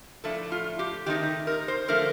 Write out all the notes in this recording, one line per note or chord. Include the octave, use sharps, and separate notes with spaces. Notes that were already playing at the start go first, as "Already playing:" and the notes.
A2 F3 A3 D4 A4
F4
G4
D#3 A3 C4 D#4 G4
A#4
C5
D3 F3 A3 A#4